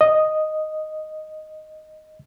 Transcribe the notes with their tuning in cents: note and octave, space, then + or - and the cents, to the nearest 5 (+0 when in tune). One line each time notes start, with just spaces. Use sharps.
D#5 +0